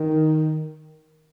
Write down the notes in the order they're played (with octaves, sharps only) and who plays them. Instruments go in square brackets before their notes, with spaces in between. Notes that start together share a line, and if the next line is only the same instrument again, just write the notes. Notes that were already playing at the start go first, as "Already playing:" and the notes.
Already playing: [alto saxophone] D#3